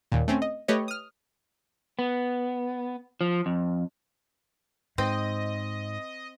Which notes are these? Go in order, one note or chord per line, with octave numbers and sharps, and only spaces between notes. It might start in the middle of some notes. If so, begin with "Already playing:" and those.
D#2 A#2
A3 C4 C#4
D#5
A3 G4 B4 C#5 D#5
D#6 F6
B3
F3
F2
G#2 C4 D#5